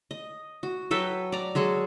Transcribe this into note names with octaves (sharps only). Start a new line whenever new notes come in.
D#5
F#4
F#3 A4 B4 G5
D5 A#5
F#3 G#3 G#4 A4